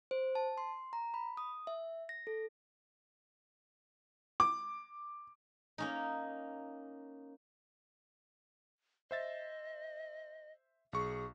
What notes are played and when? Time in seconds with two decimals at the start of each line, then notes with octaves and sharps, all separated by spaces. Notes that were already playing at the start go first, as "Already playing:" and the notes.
0.11 C5
0.35 A5
0.58 C6
0.93 A#5
1.14 B5
1.37 D#6
1.67 E5
2.09 A#6
2.27 A4
4.40 D6
5.78 A#3 C#4 D#4
9.11 C5 D#5 E5 A6
10.93 B1 G#4 C#6